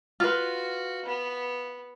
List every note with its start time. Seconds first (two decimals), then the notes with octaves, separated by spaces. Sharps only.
0.20 F4 F#4 B4
1.05 B3